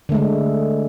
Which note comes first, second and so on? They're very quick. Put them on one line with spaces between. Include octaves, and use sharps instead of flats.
D3 A3 G#3